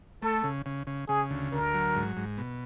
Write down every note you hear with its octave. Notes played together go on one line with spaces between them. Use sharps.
A3 A4
C#3
C#3
C#3
C#3 G#4
D2
D2 A#4
F#3
G#2
G#2
B2